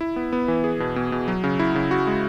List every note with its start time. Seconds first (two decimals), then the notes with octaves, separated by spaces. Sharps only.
0.01 E4
0.16 B3
0.33 B3
0.48 E3
0.64 G#4
0.80 B2
0.96 B2
1.12 B2
1.28 F#3
1.44 C#3
1.59 E4
1.76 C#3
1.91 F#4
2.07 G#3